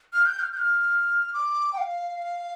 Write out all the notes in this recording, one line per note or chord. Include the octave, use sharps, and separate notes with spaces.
F6
G6
F6
G6
F6
D6
G5
F5